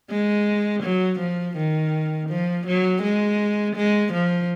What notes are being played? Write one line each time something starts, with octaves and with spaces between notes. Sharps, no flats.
G#3
F#3
F3
D#3
F3
F#3
G#3
G#3
F3